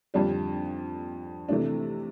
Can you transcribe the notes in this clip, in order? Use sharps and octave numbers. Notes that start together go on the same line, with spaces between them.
F2 D3 G3 D4
C3 E3 A3 D4